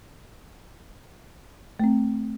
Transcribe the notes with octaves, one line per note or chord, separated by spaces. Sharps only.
A3 C4